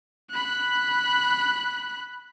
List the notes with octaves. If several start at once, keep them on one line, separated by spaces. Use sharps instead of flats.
B5 F#6